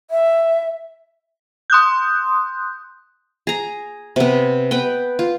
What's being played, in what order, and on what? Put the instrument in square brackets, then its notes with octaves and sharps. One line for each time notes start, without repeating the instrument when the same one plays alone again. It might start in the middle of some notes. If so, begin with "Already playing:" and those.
[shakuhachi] E5
[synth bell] C6 D#6 F#6 G6
[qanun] G#4 A#5
C3 B3
B3 B4 G5
F4